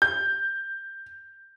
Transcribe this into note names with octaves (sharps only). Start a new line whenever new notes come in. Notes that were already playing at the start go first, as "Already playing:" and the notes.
G6